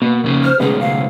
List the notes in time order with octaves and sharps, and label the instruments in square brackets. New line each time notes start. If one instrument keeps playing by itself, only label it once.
[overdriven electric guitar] B2 [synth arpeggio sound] A#3
[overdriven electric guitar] F2 C#3
[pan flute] C5 [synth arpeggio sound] F6
[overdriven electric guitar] B1 A3 [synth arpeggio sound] C#3 G#3 B3 [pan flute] G#4
[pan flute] F5